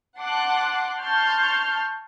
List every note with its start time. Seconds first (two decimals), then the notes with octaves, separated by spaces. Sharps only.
0.18 F#5 A5 C6 D6 F#6
1.00 A5 C6 C#6 F6 G6